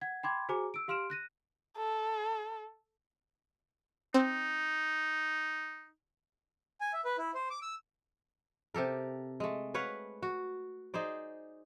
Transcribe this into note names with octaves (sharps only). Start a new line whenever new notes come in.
F#5 G#6
G5 B5 C6 D6 G#6
F#4 G#4 C5 G#5 A#5 D6
E6 D7
G4 F5 C6 F6 D7 E7
F#6 A#6 D#7
A4
C4 D#4
G#5
E5
B4
E4
C5
D6
E6
C3 G4 A4 A#4
G#3 A3
B4 C#5 F5 F#5
F#4
D#4 G#4 C5 D5